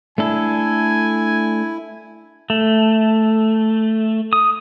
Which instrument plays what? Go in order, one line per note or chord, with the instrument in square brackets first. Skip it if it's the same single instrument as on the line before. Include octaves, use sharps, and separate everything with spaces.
[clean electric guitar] A3 D4 A4 [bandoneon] E4 [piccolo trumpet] G#5
[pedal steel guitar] A3
D#6